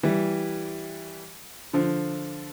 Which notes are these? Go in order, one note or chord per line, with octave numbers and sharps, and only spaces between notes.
E3 G3
D3 F3